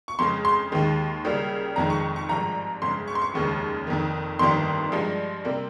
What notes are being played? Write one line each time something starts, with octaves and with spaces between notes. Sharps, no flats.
C#6
F2 C#3 G#3 C6
C6
D#2 D#3 G#3
C#2 C#3 G3 A#3
F1 F2 D#3 G#3 A#5
C#6
C#6
G#1 G2 F3 G#3 A#5
G1 F2 C#3 G#3 C6
C#6
C6
C#6
F1 D#2 C#3 G#3
F1 F2 D#3 A#3
G1 F2 D#3 G3 A#3 C6
G2 F3 G#3
C3 G3 A#3